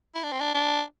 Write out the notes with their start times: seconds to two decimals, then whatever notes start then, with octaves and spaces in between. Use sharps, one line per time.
0.15 E4
0.23 D4
0.32 C4
0.40 D4
0.54 D4